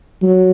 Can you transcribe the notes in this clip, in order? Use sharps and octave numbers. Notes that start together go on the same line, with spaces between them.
F#3